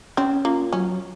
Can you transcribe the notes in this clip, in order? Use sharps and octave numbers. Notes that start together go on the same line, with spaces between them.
C4 C#4
A#3 F4
F#3 C#4